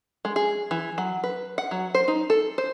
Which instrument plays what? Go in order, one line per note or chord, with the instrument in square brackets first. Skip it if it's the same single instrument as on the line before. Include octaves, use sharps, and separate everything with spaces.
[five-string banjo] G#3
G#4
E3
F#3
B4
F#5
F#3
C5
D#4
A4
C5